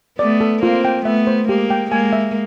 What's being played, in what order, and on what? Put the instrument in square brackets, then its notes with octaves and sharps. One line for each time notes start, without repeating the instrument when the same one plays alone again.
[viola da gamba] A3 B3 [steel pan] D5
[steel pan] A4
[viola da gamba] A#3 C4 [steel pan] F4
[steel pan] G5
[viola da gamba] A3 B3 [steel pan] E5
[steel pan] C5
[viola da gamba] G#3 A#3 [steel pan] G4
[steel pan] G5
[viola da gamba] G#3 A#3 [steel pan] G#5
[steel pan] E5